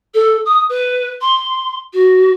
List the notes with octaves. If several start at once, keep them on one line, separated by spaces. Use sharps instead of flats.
A4
D#6
B4
C6
F#4